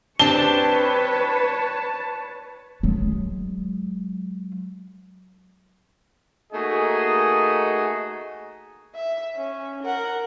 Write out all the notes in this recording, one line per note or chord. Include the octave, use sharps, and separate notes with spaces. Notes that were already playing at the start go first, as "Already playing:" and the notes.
C4 D4 G4 B4 C#5 A5 G7
F#3 G#3
A3 A#3 D#4 F#4 G#4 D#5
E5
C#4
A#4 F#5